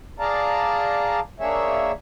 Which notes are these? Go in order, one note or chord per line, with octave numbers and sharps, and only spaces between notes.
G#4 D5 F5 A5 A#5
A#3 D4 G#4 C#5 E5